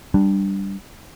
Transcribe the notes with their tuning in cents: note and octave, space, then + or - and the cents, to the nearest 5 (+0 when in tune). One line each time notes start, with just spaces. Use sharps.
G3 +0 D4 +0